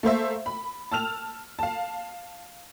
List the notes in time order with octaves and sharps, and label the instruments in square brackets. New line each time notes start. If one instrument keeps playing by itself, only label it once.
[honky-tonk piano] A3 A#3 C5 E5
B5
A5 E6 F6 F7
F5 A5